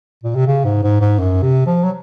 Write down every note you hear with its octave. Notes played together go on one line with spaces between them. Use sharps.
A#2
C3
C#3
G#2
G#2
G#2
F#2
C3
F3
F#3